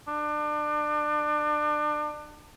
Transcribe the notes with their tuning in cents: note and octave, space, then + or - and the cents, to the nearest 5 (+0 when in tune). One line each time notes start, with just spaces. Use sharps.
D4 +30